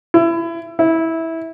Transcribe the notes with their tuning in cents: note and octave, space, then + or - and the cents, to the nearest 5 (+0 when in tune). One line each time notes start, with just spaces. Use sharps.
E4 +25
E4 -15